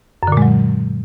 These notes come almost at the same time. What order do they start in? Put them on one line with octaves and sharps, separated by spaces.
F#2 D3 A#2 G#3 F#3